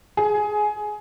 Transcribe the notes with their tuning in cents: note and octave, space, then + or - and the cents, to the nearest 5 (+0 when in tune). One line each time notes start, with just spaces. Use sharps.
G#4 +15